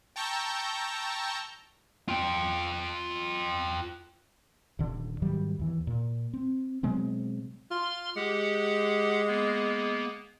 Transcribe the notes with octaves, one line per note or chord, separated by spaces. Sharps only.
G5 A5 A#5 C#6 E6 G6
F4 G5
D#1 D3
G#2 D#3 F#3 G3
D#2 E3
A#2
C4
B2 F#3 G#3 C4
F4 C6 F6
G#3 G4 F#5
A#3 B3